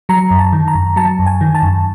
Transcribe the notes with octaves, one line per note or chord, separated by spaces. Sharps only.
F#3 A#5
F#2
A5
D#3
A#5
F#2
F#3 A5
F#2
G#5
D#3
A5
F#2